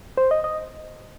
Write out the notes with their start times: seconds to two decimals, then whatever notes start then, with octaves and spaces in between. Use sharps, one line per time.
0.17 C5
0.31 D#5
0.44 D#5